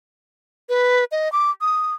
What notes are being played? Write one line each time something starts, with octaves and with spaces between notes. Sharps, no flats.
B4
D#5
D6
D#6